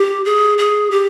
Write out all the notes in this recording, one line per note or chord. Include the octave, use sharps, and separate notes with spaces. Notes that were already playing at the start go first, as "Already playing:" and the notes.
Already playing: G4
G#4
G#4
G4